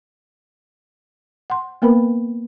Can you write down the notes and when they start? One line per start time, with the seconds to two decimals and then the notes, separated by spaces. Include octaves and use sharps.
1.50 F#5 C6
1.82 A#3 B3 A#4 B4 B5